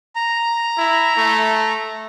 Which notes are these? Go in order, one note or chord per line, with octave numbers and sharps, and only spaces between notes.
A#5
E4
A3